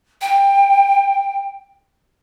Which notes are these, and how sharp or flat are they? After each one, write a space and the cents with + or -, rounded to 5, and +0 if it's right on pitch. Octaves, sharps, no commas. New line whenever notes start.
G5 +20